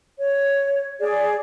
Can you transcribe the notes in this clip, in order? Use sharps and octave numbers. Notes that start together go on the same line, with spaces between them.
C#5
G#4 D5